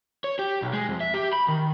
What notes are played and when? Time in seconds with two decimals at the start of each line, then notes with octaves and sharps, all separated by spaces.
0.24 C#5
0.39 G4
0.62 B1
0.73 G#3
0.89 F2
1.00 E5
1.14 G4
1.33 B5
1.48 D#3